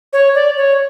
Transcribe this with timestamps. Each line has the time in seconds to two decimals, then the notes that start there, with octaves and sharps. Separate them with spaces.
0.13 C#5
0.35 D5
0.57 C#5